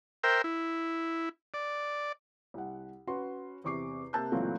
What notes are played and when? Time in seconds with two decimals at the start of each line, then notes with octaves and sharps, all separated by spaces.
0.23 A#4 C5 E5 G5
0.44 E4
1.54 D5
2.54 C2 F#5
3.07 C#4 F#4 B4 C6
3.64 E2 C3 C#6 D6 C7
4.13 C3 A#3 A5 E6 F#6 G6
4.32 C#2 A#2 E3 F#3 A3 C4